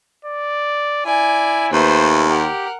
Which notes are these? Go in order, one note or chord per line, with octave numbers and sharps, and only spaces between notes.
D5
E4 D5 G#5
D#2 A3 B4 C5
G4 A#4 F#5